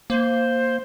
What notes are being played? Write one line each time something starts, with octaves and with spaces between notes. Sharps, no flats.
A#3 C5